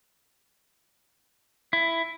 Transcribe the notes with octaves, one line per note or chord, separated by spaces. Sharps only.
E4